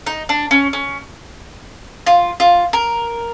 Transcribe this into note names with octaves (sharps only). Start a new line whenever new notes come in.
D#4
D4
C#4
C#4
F4
F4
A#4